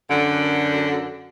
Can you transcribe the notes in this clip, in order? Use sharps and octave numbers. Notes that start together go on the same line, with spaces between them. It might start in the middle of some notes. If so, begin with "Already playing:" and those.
F#2 D3